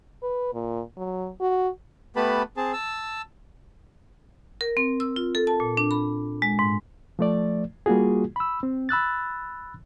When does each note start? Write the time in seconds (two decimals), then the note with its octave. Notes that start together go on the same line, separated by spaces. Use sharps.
0.22 B4
0.53 A#2
0.97 F#3
1.40 F#4
2.16 A3 B3 G4 B4 A5 B5
2.57 C4 G#4 A5
2.73 A5 E6
4.61 A#4
4.77 C4
5.00 E6
5.16 F4
5.35 A4
5.47 A5
5.60 A#2
5.77 D4
5.91 B5
6.42 G#3
6.59 G#2
7.19 F3 A3 D5
7.86 G3 A#3 F4 F#4 G#4
8.36 B5 E6
8.63 C4
8.89 B5 E6 F#6 A6